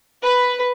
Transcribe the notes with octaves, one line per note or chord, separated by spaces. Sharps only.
B4